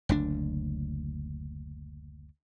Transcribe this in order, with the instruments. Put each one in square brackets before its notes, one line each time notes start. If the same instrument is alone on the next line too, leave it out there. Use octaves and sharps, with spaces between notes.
[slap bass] F#1 D2 D4